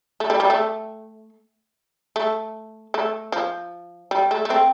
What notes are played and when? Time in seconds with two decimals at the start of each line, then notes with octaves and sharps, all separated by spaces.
0.20 A3
0.30 G3
0.40 G3
0.50 A3
2.16 A3
2.94 A3
3.32 F3
4.11 G3
4.31 A3
4.45 A3
4.50 C4